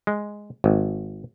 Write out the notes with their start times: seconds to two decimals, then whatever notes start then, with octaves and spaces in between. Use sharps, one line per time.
0.07 G#3
0.64 G#1